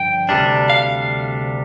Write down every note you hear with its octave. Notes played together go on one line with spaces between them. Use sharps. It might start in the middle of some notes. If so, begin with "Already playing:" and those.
Already playing: G2 D3 F3 G5
D2 C3 G3 D4
F5